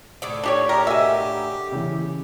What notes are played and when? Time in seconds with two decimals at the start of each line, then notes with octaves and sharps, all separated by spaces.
0.22 A2 D3 D5 D#6
0.44 D4 G4 C#5
0.69 G4 A#4
0.87 F#4 A#4 D#5 E5 G#5
1.72 C#3 E3 G4